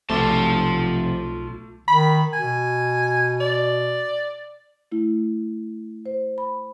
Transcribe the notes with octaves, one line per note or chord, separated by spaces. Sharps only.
B1 C3 F3 A3 C4 F4 A5 D6
D#3 B5
B2 G#5
D5
A3 E4
C5
B5